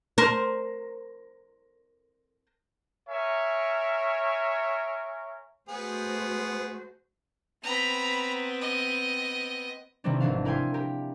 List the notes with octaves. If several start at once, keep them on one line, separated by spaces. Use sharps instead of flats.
A#4 C5
A#4 C#5 E5 G#5
A3 B3 F#4 G#4 C5
B3 C4 A#5 B5
D#5
C3 D#3 E3 G3 C4 D4
G#1 E3 D4 F5
E4 A#4 F5 G5 G#5 C6
G4 A#4